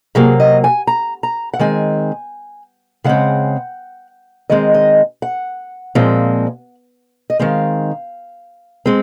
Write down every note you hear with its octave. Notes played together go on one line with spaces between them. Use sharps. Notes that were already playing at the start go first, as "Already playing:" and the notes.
C3 F#3 A#3 G#4
D#5
G#5
A#5
A#5
F#5
D#3 G#3 C4 G#5
C#3 G#3 C4 F#5
D#3 G#3 C4 D#5
D#5
F#5
A#2 F3 G#3 C4
D#5
D#3 G#3 C4 F5
G#3 C4